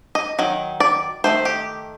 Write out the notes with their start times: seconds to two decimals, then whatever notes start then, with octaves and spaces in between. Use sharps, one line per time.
0.15 D#5
0.39 D#3 F#3
0.80 D5
1.24 D#3 A3 C5
1.45 G4